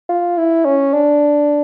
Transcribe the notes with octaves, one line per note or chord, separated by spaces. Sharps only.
F4
E4
C#4
D4